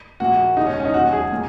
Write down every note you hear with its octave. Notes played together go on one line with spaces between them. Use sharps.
A#1 A#2 A#3 F#4
E1 D#2 C#3 G#3 D#4
C#4
C#4
D#4
E1 D#2 D#3 F#3 F#4
G#4
A#2 A#3